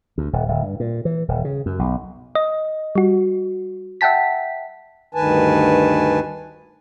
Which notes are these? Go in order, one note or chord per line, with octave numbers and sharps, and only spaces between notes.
D2
D#1
D1
G2
A#2
E3
D#1
C#3
F#2
B1
D#5
G3 F#4
E5 F#5 G5 A5 B6
D2 G2 D#3 B4 G#5 A5